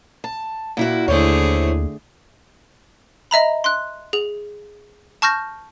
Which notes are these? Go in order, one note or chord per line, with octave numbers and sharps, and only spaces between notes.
A5
A#2 E4 F#4
D#2 D3 A3 E4 G#4 C5 C#5
D#5 E5 A#5 B5
C6 F#6
G#4 F7
A5 C#6 F6 G6 A#6